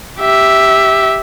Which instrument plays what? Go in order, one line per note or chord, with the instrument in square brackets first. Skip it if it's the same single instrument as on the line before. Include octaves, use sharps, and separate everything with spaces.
[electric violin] G4 E5